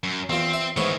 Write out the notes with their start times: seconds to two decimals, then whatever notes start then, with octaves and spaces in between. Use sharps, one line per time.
0.04 F#2
0.30 E2 C4 F4
0.53 E5
0.77 G#2 D#3 E3 B3 C#5